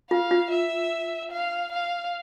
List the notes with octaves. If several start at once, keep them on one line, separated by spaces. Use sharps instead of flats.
F4 F5
F4
E5
F5
F5